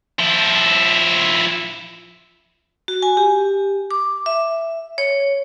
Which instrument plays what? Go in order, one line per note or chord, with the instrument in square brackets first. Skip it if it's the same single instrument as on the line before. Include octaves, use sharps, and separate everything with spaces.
[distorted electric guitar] F3 E4
[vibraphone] F#4
G#5
G4
D6
E5
C#5